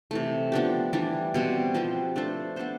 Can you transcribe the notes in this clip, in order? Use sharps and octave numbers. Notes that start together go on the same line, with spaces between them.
C3 E3 A3
F3 B3 D4 G4
E3 G3 D4
B2 G3 C4
F3 C4 G4 B4
A3 D4 A4 C5
B3 D4 A4 C5